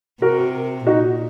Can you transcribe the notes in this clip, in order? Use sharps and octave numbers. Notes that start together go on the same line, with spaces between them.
C3 F#4 A#4
A#2 D#4 F#4